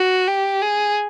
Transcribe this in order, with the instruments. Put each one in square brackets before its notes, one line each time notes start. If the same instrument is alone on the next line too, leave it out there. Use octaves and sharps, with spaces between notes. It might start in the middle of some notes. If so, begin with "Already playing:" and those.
Already playing: [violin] F#4
G4
G#4